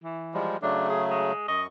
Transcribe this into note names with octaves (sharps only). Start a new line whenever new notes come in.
E3
F3 G3 G#3
C#3 F#3 A3 D4
G#4
G#3
F#2 D#5 C#6